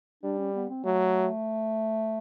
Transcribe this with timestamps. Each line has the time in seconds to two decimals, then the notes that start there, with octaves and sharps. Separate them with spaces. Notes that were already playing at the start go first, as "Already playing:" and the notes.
0.23 G3 D4
0.39 C#4
0.55 B3
0.70 C4
0.85 F#3 A3